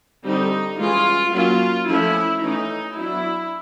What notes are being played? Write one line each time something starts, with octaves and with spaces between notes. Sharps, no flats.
D3 G3 C4 D#4
E3 G#3 C#4 F4
F#3 A#3 C#4 F4
F3 A3 C#4 E4
E3 A3 C#4 D#4
F#3 B3 D4 E4